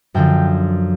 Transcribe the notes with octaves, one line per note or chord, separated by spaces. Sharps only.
F#2 D3 F3 G5